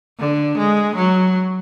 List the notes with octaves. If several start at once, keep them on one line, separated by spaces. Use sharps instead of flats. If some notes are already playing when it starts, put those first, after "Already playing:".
D3
G#3
F#3